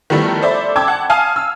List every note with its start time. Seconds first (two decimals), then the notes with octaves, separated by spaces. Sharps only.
0.10 D#3 F3 G3 A3 B3 E4
0.42 A4 C5 D5 E5 B5
0.76 G5 A5 D6 E6 G#6
0.88 F#5 A5
1.10 F5 G#5 A5 D#6 F6
1.36 E6